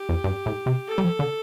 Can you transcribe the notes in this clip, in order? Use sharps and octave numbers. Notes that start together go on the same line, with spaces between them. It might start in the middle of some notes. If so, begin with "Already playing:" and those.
Already playing: G4
F2
G2
A2
C3
A4
G3
F3
D3